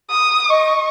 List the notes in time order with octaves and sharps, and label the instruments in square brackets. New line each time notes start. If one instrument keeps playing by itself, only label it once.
[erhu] D#6
[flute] D#5 [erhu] C#6